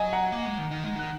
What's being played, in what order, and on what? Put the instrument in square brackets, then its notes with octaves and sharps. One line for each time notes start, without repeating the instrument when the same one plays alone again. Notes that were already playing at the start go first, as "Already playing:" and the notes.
Already playing: [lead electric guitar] F#3 [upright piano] D#5 G#5
[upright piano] F#5 A#5
[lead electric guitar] A#3
G#3
D#3
D#3
G#3
[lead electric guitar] D#3 [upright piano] F#6